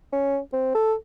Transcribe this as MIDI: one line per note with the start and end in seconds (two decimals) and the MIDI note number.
0.12 0.38 61
0.53 0.71 60
0.75 0.94 69